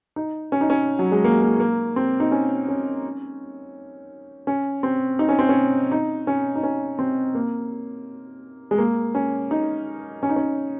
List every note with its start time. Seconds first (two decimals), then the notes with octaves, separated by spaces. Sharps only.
0.16 D#4
0.52 C#4
0.61 D#4
0.70 C#4
0.99 F#3
1.12 G#3
1.24 A#3
1.42 A#3
1.60 A#3
1.96 C4
2.20 D#4
2.32 C#4
2.68 C#4
4.47 C#4
4.83 C4
5.19 D#4
5.29 C#4
5.39 C4
5.49 C#4
5.92 D#4
6.27 C#4
6.56 D#4
6.63 C#4
6.99 C4
7.35 A#3
8.71 G#3
8.78 A#3
9.15 C#4
9.51 D#4
10.23 C#4
10.29 D#4
10.36 C#4